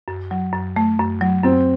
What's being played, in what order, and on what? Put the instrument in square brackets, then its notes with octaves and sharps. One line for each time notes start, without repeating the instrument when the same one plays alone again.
[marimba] F#2
F#3
F#2
A3
F#2
F#3
[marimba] F#2 [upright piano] C4